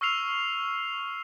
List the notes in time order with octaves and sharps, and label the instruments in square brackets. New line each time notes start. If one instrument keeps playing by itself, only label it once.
[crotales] C#6 E6 F6 C7 F7